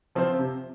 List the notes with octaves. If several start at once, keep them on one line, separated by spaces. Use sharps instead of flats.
F3 C4 F4 C5
C3